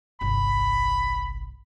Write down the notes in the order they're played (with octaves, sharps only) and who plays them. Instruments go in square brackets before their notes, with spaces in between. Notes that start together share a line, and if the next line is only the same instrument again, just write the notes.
[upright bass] G1 C2 [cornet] B5